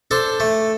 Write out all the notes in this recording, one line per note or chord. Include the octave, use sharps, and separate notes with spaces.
D4 A4 C5
A3